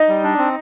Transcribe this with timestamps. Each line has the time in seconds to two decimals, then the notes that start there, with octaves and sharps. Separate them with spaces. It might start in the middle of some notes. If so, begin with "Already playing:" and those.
Already playing: D#4 D#5
0.09 G3
0.24 D4
0.38 C4